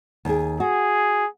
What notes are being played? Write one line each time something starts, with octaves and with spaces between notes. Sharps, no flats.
D#2 G#4
F#4 G#4